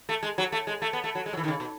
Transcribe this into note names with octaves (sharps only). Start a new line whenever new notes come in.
A3
G#3
F#3
A3
G#3
A3
B3
A3
F#3
G#3
F#3
E3
D#3
C#3
B2